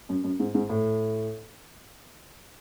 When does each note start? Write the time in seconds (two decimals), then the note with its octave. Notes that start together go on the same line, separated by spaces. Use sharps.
0.09 F#2
0.24 F#2
0.40 G#2
0.54 G#2
0.69 A2